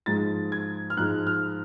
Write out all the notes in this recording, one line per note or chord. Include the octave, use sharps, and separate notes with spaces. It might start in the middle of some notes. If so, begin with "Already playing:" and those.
G#2 F3 G#3 A6
G#6
F6
G#2 F3 G#3 F#6
F6